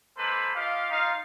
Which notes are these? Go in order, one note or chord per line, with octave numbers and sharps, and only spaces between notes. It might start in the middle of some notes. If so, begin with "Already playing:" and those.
G#3 A#3 A4 B4 C5 B5
F4 G4 D#5 F5
D#4 F4 D#5 F5